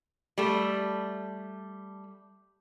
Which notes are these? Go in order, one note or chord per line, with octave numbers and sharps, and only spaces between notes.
G3 A3